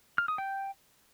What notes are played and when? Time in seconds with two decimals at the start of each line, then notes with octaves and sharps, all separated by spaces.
0.18 F6
0.28 D#6
0.38 G5